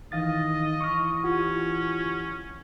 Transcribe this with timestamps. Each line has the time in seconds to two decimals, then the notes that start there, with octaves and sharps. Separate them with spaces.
0.12 D#3 E3 D#5 F5 A6
0.81 E3 C#6 D#6 F6
1.24 C#4 F4 G4 F#5